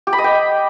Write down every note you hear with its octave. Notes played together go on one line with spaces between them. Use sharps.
G4
B5
D#5
G5